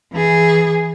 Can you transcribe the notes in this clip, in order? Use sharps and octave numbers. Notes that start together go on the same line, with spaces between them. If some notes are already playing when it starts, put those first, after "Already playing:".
E3 G#4